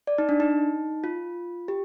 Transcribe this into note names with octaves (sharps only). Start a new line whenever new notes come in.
D5
D#4
D4
D#4
F4
G4